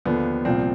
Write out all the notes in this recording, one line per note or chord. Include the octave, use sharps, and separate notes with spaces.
D#2 D3 F3 B3
C2 A#2 F3 C4